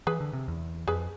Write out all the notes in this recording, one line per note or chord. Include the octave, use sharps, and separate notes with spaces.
E3 G#4 B4
D3
C3
E2
F2 G#4 B4